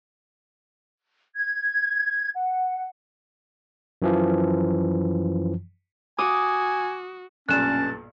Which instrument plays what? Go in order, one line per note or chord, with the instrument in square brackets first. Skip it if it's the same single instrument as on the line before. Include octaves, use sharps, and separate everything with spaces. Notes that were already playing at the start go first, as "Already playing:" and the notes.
[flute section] G#6
F#5
[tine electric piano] F#2 E3 F3
[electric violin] F#4 [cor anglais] G#5 [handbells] D6 [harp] D#6
[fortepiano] B1 G2 A#2 [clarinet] C#4 [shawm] A5 [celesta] F#6 E7